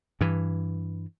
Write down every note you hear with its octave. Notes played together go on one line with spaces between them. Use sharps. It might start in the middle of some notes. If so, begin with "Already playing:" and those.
G2 E3